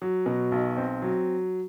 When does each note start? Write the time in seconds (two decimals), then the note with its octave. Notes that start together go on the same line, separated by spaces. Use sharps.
0.02 F#3
0.26 B2
0.52 B1
0.77 C4
1.02 F#3